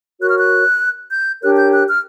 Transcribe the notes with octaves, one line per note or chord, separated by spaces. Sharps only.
F#4 A#4 C#5 F#6
F6
F#6
G6
D4 G4 A#4 C#5 F#6
G6
F#6
F6